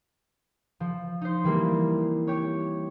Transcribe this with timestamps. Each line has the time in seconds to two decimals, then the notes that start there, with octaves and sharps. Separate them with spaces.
0.80 F3
1.21 D#4 C5
1.44 E3 G3 A#3 C4
2.27 G4 C#5